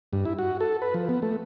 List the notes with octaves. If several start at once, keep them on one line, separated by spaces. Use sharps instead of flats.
G2
E4
F#4
A4
B4
F3
B3
A3